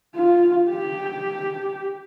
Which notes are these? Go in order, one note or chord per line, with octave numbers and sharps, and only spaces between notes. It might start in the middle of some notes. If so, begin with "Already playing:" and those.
F4
G4